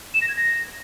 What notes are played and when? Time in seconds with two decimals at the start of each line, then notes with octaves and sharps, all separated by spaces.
0.14 E7
0.22 A#6
0.29 G#6
0.36 A#6